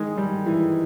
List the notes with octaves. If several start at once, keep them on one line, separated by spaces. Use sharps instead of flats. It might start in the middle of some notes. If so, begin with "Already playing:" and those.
Already playing: D#3 G#3
G3
E3